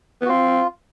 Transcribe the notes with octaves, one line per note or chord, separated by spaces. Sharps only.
B3
F#4
C4 F4